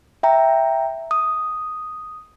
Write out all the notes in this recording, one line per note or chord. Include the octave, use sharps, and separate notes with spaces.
E5 G5 A#5
D#6